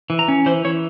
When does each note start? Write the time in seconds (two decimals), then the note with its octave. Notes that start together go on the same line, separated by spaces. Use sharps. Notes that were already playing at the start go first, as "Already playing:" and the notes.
0.10 E3
0.19 A#5
0.28 C#4
0.46 E3 C5
0.65 E3 C#5